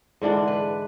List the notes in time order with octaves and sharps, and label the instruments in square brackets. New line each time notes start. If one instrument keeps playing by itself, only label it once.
[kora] G#2 D3 E3 D4
B4